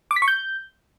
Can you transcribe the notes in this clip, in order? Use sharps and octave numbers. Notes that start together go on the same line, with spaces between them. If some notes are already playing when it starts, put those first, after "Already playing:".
D6
B6
C#6
G6